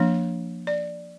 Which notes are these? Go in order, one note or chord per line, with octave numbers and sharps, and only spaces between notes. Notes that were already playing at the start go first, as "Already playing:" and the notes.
Already playing: F3 A#3 D4
D5